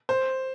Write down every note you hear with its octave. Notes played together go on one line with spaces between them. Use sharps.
C5